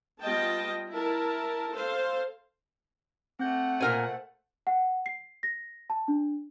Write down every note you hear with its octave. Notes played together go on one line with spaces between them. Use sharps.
G3 B3 F4 D#5 G5 A5
E4 A#4 A5
A4 C5 F5
A3 C4 F#5 G6
A#2 A#4 C5 G#5
F#5
C7
A#6
A5
D4